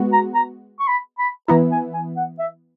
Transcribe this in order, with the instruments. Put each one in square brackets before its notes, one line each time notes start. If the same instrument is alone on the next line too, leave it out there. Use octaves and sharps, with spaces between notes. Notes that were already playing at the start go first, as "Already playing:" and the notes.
Already playing: [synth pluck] G#3 B3 F#4
[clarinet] A#5
A#5
C#6
B5
B5
[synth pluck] E3 B3 E4 [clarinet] A#5
[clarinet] G#5
G#5
F#5
E5